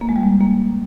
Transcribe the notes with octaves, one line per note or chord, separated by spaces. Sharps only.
A#3
G#3
G3
G#3
A#3